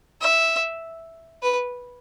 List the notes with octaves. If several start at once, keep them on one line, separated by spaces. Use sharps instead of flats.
E5
B4